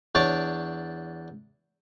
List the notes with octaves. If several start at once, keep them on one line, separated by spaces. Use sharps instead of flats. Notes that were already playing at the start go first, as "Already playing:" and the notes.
E2 D4 C#5 D5